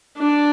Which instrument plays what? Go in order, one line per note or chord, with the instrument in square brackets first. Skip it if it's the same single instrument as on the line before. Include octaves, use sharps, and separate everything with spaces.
[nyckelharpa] D4